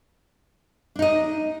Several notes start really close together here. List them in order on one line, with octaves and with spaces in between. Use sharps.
D4 D#4 D#5